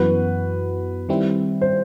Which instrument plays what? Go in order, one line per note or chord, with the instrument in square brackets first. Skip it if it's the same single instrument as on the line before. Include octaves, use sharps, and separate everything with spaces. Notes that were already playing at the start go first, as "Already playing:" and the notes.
Already playing: [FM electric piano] F#2 E3 B3 F#4 [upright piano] B4
[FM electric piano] D#3 G3 C4 E4
[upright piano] C5